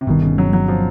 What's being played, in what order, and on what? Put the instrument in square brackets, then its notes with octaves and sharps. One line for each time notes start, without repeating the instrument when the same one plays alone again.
[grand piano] C3
[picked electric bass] G1 G2 D#3 [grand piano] B2
[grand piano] C#3
F#3
F#3
F3